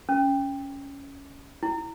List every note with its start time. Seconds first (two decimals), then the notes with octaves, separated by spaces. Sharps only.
0.09 C#4
1.63 E4